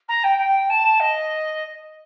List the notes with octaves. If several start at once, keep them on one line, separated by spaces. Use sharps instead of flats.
A#5
G5
G5
A5
D#5